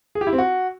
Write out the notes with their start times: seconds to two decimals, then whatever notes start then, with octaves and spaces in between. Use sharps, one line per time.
0.15 G#4
0.21 G4
0.27 E4
0.33 C4
0.38 F#4